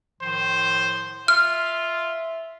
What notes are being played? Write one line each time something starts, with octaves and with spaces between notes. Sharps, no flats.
A2 D#3 F3 C5
F4 E5 F6